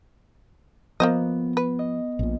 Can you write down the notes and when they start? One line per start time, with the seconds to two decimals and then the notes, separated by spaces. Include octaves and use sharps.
1.00 F3 A#3 B3 C5 D#5
1.57 B4
1.79 D#5
2.19 A#1 A#2